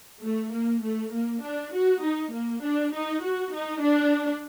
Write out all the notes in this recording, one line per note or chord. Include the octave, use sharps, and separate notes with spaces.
A3
A#3
A3
A#3
D4
F#4
D#4
A#3
D4
D#4
F#4
D#4
D4